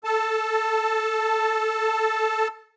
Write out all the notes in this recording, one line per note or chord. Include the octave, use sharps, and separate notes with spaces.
A4 A5